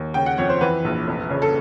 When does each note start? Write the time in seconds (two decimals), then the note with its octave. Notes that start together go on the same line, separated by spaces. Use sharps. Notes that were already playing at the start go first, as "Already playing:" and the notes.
Already playing: D#2
0.14 C#3 G5
0.26 F#5
0.38 F2 C#5
0.49 C5
0.61 E3 B4
0.85 A#1
1.07 F1
1.30 C#3
1.42 A4